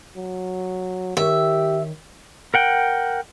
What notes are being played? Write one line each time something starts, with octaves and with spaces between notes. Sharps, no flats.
F#3
D#3 G4 C#5 E5
A#4 F#5 G5